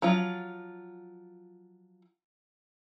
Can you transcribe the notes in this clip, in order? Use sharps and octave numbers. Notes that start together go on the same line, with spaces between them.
F3 F#3 F4